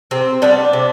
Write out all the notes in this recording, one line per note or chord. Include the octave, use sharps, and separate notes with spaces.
C3 C4
G3 B3 D4
C3